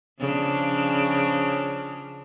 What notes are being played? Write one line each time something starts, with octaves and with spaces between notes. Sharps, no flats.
C#3 F3 D4